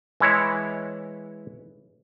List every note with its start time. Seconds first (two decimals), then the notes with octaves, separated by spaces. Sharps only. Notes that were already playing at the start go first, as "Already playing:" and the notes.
0.20 E3 G#3 E4 C#5 E5